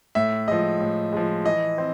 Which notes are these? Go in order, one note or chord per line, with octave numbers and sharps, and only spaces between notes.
A2 E5
F3 G#3 D#5
A2
F3 G#3
E3 D#5
C4